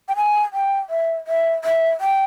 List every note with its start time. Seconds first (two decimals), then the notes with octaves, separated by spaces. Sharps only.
0.09 G5
0.16 G#5
0.53 G5
0.90 E5
1.27 E5
1.64 E5
2.01 G5